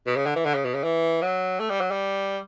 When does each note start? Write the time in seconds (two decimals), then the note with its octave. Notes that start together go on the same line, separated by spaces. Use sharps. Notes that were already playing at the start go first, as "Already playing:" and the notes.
0.06 B2
0.16 C#3
0.26 D3
0.36 E3
0.45 D3
0.55 C#3
0.65 B2
0.74 C#3
0.84 E3
1.22 F#3
1.60 A3
1.70 G3
1.81 F#3
1.91 G3